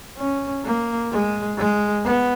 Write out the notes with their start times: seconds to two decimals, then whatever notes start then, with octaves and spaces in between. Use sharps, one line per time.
0.18 C#4
0.64 A#3
1.12 G#3
1.58 G#3
2.05 B3